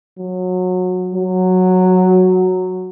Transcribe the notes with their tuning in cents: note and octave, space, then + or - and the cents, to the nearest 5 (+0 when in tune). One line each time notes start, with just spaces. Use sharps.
F#3 -20
F#3 -5